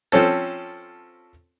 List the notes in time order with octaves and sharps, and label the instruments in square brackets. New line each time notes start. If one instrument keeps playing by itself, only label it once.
[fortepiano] F3 C4 C#4 A4